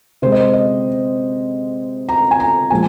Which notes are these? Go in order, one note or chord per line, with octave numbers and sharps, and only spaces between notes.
C3 G#3 C5
D#5
C5
D#5
A#5
G#5
A#5
A#2 F3 G#3 G#5